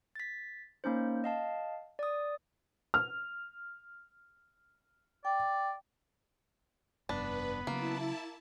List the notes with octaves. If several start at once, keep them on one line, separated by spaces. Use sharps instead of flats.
A6 B6
A#3 C#4 D#4 C5
D#5 F5 A5
D5 D#6
F6
D5 G5
F1 G2 B3 D4 B4
C#3 F#3 A#3 E4 A5